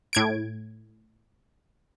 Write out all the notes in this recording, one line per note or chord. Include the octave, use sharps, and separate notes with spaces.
A2 G#6 D7